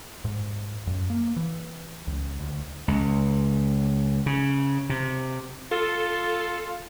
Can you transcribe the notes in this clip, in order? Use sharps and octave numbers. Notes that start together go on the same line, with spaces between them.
G#2
F#2
A#3
E3
C#2
D2
C#2
C#3
C3
F4 A4